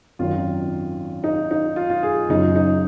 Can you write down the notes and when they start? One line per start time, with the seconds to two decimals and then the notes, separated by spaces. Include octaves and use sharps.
0.19 G#1 F#2 D#3 F4
1.24 D#4
1.51 D#4
1.76 F4
1.90 F4
2.03 G#4
2.29 F#1 F#2 C#3 D#4
2.56 D#4